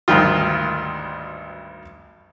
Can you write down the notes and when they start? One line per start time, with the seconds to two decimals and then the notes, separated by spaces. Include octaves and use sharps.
0.08 G#1 D2 G2 D#3 F4